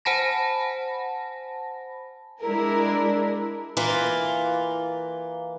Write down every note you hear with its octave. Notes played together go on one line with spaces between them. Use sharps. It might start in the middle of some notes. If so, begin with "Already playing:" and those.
C5 F#5 G#5 A5 B5 A#6
G#3 D4 E4 G#4 A#4
E3 A#3 F4